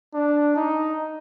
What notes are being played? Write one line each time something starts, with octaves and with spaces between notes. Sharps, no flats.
D4
D#4